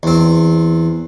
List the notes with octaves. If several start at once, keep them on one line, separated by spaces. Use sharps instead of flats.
E2 C4